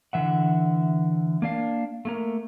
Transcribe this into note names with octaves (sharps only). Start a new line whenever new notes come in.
D3 E3 E5 F#5
A#3 D4 F5
A3 A#3 A#4